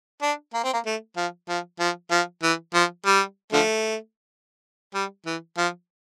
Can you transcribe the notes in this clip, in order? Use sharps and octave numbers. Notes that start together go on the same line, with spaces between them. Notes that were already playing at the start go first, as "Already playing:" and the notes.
D4
A#3
C4
A#3
A3
F3
F3
F3
F3
E3
F3
G3
D3 F3 A3
G3
E3
F3